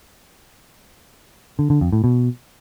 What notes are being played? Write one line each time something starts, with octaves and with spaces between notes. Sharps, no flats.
D3
D3
F2
A2
B2